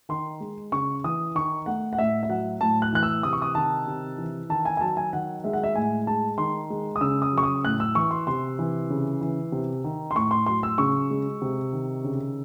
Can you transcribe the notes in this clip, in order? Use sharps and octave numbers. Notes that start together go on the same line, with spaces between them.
D#3 C6
G#3
C#3 C#6
E3 D#6
D#3 C#6
A3 F#5
F#5
A2 E5
E5
F#3 F#5
A2 A5
F#6
E3 F#6
E6
C3 D#6
C#6
D#6
D#3 A5
C3
E3
D#3 A5
G#5
G#5
F#3 A5
G#5
D#3 F#5
G#3 E5
F#5
E5
A2 G#5
G#3 A5
D#3 C6
G#3
D#6
C#3 E6
D#6
F#3
C#6
D#6
A2 F#6
E6
E3 C#6
C6
C3 C6
E3
C#3
E3
C3
D#3
C6
A2 C#6
C6
F#3 C6
E6
C#3 C#6
G#3
C3
D#3
C#3